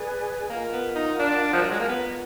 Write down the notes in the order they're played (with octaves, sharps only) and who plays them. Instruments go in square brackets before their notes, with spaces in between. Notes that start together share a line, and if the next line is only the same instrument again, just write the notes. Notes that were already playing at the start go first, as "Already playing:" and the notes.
Already playing: [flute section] G#4 B4 D5 G#5
[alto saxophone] A#3 [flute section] F4 A#4 D#5 F#5
[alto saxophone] B3
D#4
D4
F3
F#3
G#3
A#3
[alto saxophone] B3 [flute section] F4 B4 D#5 A#5